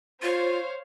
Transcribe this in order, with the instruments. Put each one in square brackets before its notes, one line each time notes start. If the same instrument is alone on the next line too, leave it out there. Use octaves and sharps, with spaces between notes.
[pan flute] F4 [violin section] C5 C#5 F5